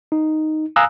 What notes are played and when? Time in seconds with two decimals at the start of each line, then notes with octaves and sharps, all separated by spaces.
0.12 D#4
0.76 F5 G#5 A#5 D#6 E6 F#6